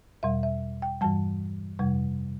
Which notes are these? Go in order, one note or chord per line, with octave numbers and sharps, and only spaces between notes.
E2 B2 G3 E5
E5
G5
G2 E3 G3 A5
F2 C3 G3